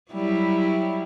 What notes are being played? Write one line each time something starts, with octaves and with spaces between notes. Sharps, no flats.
F#3 G3 E4